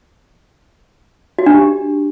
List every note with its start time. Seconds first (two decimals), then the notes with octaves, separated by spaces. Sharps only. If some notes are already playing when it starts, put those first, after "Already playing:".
1.39 F#4
1.46 D4
1.54 G4